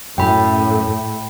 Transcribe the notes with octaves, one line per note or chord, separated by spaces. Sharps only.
F#2 A2 G5 B5